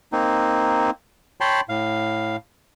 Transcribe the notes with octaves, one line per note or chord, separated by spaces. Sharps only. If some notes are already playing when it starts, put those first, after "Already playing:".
A#3 C4 D#4
C#5 G5 A5 B5 C6
A2 F5